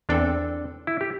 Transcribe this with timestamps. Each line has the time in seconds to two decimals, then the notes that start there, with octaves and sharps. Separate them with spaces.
0.09 E2 E3 C4 D4 A4
0.87 E4
1.01 G4